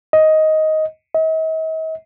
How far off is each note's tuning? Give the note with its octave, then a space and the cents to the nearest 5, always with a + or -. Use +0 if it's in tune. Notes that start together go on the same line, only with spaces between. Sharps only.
D#5 +10
D#5 +45